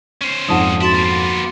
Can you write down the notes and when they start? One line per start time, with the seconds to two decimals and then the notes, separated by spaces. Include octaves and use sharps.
0.21 C#4 C5
0.48 G#1 F2 F#5 A5 D#6
0.81 E4 F#4 C6 A6
0.94 A#3 B3